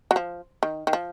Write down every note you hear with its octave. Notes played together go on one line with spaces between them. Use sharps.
F#3
F3
D#3
D#3
F3